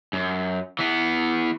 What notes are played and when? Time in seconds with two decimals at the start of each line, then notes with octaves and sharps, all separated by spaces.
0.13 F#2
0.79 E3 B3